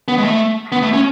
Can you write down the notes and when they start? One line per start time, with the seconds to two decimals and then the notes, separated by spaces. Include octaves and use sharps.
0.08 B3
0.18 G#3
0.24 A3
0.72 B3
0.82 A3
0.94 C#4